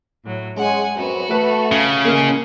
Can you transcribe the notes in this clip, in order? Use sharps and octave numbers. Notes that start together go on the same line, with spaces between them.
A2 F#3
G#3 C#4 F#5 G#5
F#2 B3 C4 F#4
A3 B4
C#3
A2 G#3 A#3